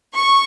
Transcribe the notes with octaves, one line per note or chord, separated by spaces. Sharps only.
C#6